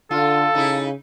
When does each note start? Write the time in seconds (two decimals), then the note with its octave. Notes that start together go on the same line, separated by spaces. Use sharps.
0.11 D3 F4 A4
0.55 C#3 D#4 E4